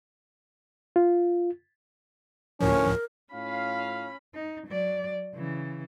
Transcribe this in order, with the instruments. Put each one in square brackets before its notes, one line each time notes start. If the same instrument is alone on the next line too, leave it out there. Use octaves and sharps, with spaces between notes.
[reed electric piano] F4
[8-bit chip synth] D2 A2 F3 [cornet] C#4 [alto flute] A#4
[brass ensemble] A2 F4 F5 [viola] C#4 B5
[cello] D#4
F#3 D5
C#3 E3